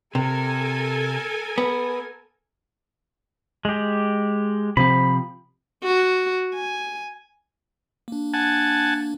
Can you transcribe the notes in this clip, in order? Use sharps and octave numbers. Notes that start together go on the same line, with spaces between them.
C3 A4 A#4 G#5
B3
G#3 G4
C3 F3 C4 B5
F#4
G#5
A#3 D4
F#5 G#5 A5